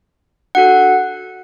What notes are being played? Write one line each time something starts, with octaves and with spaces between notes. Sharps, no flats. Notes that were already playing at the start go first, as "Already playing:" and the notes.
D4 F#4 A4 F#5